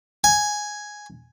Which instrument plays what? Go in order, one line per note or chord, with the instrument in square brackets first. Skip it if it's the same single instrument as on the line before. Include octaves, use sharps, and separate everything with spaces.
[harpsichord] G#5